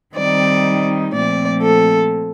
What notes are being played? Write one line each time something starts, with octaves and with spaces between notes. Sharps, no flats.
D#3 G3 C4 D#4 D5
A#2 F3 A3 C4 D5
A4